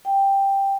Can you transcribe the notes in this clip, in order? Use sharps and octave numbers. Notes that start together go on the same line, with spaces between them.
G5